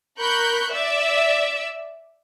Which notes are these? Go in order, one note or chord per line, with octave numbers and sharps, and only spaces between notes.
A#4 B5 C#6 F#6 G6
D5 E5